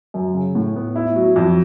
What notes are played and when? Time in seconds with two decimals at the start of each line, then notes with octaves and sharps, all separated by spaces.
0.14 F#2
0.34 C#3
0.55 A2
0.76 B3
0.96 E4
1.16 F#3
1.36 F2